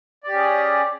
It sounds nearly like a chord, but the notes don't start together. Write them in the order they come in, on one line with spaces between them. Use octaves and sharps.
D5 G4 C#4 G#4